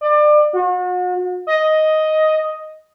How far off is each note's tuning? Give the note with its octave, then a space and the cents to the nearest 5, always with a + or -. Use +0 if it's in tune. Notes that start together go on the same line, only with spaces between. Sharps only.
D5 +30
F#4 -40
D#5 +5